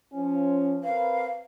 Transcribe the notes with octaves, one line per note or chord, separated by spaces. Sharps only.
F3 C#4
C4 A#4 B4 F5